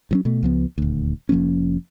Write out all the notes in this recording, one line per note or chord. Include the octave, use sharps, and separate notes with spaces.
G2 F#3 C#4
B2 A3
C#2 F3 B3
D#1 D2
F1 F3 A#3 C#4